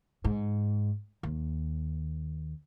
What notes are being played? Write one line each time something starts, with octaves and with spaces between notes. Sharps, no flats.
G#2
D#2